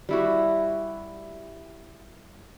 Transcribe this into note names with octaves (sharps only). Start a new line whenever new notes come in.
G3 E4 F#4